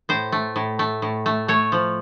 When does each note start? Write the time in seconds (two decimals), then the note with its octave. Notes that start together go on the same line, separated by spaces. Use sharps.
0.09 A2 C5
0.32 A3
0.56 A2
0.79 A3
1.02 A2
1.26 A3
1.48 A3 C#5
1.72 F3